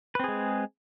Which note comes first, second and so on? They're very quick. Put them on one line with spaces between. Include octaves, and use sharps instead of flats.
B4 C4 G#4 G#3